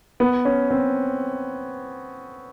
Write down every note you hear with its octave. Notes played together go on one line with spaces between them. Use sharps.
B3
C#4
C4